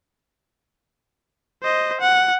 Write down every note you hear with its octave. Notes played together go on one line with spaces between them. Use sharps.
C5 D#5
F#5